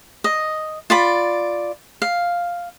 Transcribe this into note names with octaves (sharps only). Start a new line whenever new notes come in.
D#5
F4 D5 B5
F5